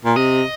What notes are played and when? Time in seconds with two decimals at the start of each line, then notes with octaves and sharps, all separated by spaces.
0.05 A#2
0.16 C3 D#5